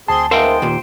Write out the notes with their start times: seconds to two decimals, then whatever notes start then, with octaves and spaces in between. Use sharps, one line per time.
0.08 D2 C4 G#4 A5 C6
0.31 G#2 G#3 B3 A#4 C5 E5 F5 G5
0.62 D#2 A#2